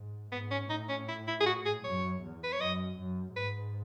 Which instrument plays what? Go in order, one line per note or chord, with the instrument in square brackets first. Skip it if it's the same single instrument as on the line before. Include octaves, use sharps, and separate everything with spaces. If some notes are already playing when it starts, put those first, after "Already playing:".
Already playing: [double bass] G#2
[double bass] G#2 [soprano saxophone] B3
[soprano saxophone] C#4
[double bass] A2 [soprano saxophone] D#4
[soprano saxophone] C#4
E4
E4
G#4
F#4
G#4
[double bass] F#2 [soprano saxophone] C#5
[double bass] E2
[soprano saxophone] B4
C#5
[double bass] F#2 [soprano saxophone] D#5
[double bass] F#2
[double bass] G#2 [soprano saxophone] B4